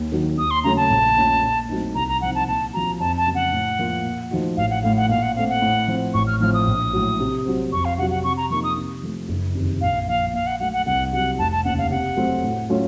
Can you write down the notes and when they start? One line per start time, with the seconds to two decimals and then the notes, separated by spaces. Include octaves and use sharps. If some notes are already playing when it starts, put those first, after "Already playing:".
Already playing: D#2
0.12 D#3 F#3
0.37 D#2 D#6
0.51 C6
0.64 C#3 F#3 A3 C#4 A#5
0.77 A5
0.90 A#1
1.16 A#2 A3 C#4 F4
1.43 A#2
1.69 F#3 A3 C4 D#4
1.95 C2 A#5
2.08 A#5
2.21 C3 F3 C4 D#4 F#5
2.35 A5
2.47 A#2 A5
2.73 F3 C4 F#4 A#5
3.00 F2 A5
3.17 A5
3.26 C#3 F#3 A#3
3.35 F#5
3.52 A2
3.79 F3 A#3 F4
4.04 A#2
4.31 F3 A3 D#4 F#4
4.57 A1 F5
4.70 F#5
4.83 A2 A3 F5
4.97 F#5
5.09 A#2 F5
5.22 F#5
5.35 A3 C4 F5
5.49 F#5
5.62 A2
5.88 F3 C4
6.14 A1 C#6
6.27 F6
6.40 A2 F3 C4 F6
6.54 D#6
6.67 A#1
6.93 A2 F#3
7.20 C3
7.46 F#3 C4
7.72 F2 C#6
7.85 F5
7.98 C3 F#5
8.02 F#3
8.10 F#5
8.24 C3 C#6
8.37 A#5
8.50 F3 A#3 D#4 C#6
8.64 D#6
8.76 C3
9.03 F3 A3
9.29 F#1
9.55 F2 C3 D#3
9.81 A#1 F5
10.07 A#2 F3 F5
10.34 A#2 F5
10.47 F#5
10.59 F#3 A3 F#5
10.73 F#5
10.86 C2 F#5
11.12 C3 F#3 F#5
11.38 F1 A5
11.52 A5
11.65 D#2 C#3 F#5
11.78 F5
11.91 C3 F#5
12.17 F#3 A3 C4 F#4
12.44 A2
12.69 F#3 A3 C#4 F4